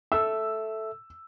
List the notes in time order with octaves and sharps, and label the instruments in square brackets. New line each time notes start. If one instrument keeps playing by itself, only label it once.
[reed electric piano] A4 E5 [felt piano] E6